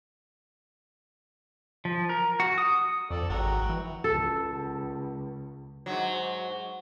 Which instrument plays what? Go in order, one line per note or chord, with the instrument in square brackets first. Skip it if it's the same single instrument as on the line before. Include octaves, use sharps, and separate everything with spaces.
[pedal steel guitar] F3
A#4
F#4
D#6
[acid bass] F2 [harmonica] A4 D5
[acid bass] G#1 [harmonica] F#4 G5 A#5
[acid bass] E3
[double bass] C#2 [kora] A4
[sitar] G#2 F#3